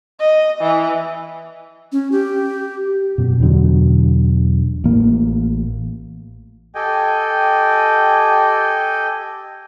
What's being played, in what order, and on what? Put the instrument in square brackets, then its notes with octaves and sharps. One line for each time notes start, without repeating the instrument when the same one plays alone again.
[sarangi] D#5
E3
[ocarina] C#4
G4
[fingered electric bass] F#2 B2
E2 B2 D3 F#3
A1 A#3
[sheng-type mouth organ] G4 A4 D#5 G5 G#5